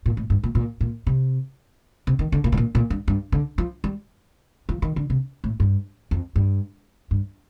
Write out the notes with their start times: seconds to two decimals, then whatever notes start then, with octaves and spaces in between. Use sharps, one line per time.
0.06 A#2
0.17 A2
0.30 G2
0.43 A#2
0.55 A#2
0.81 A#2
1.07 C3
2.07 C3
2.19 D#3
2.32 D3
2.44 A#2
2.52 A2
2.57 A#2
2.75 A#2
2.90 G2
3.08 G2
3.32 D3
3.58 F3
3.84 G3
4.69 F3
4.82 D#3
4.96 D3
5.10 C3
5.44 A2
5.60 G2
6.11 F2
6.36 G2
7.11 G2